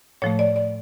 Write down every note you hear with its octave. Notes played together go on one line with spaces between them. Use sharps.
A2 F3 A3 C#5
D5
D5